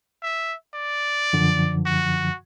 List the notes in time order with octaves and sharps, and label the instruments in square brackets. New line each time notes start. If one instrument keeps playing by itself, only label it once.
[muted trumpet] E5
D5
[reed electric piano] F#2 D3 F3
[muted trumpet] F#4